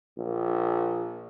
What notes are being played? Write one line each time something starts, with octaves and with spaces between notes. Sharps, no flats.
A#1